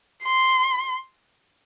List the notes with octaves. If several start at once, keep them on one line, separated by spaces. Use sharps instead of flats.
C6